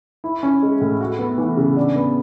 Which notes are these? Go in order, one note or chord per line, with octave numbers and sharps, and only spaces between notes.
E4
C#4
G#3
A2
F#4
B3
E3
C#3
D4
B3